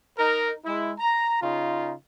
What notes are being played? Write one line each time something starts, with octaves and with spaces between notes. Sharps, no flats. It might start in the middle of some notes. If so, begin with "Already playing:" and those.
D#4 A#4
G#3 E4
A#5
C#3 D#4 F4